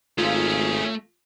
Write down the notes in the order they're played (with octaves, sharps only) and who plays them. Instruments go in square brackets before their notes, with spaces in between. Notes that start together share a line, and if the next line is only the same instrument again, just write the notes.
[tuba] G#1 [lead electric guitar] A3 [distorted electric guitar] C#4 D#4 [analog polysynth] F4